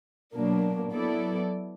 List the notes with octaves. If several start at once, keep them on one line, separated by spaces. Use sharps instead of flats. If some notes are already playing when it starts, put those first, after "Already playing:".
B2 F#3 A#3 D4
F#3 B3 E4 A4 D5